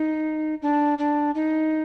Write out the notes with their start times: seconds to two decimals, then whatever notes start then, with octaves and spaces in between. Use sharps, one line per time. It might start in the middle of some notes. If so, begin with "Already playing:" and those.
Already playing: D#4
0.62 D4
0.98 D4
1.35 D#4